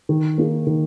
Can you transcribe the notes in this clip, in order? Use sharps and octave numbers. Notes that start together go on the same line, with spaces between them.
D#3
A#3 D#4 G#4
D#3